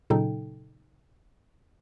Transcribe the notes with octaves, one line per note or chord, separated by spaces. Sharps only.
A#2 C#3 F#3 D#4 A4 G5